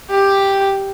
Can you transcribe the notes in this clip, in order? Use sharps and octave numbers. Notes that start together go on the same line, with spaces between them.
G4